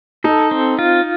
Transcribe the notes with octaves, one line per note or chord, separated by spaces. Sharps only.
D#4 A4
C4
F4